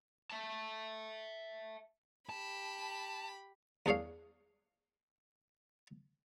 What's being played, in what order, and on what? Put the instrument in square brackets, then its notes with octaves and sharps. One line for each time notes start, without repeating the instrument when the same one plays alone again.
[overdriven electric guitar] E5 A5
[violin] G4 B5 [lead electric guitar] A5
[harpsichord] E2 D4 G#4 C#5 F5